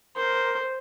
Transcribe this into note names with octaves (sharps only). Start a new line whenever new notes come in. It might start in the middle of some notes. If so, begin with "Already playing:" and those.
A#4 C5
C5